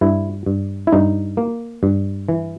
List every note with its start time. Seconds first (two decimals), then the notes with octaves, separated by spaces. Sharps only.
0.01 G2 E4
0.46 G2
0.87 E4
0.92 G2 D#4
1.37 A#3
1.83 G2
2.28 E3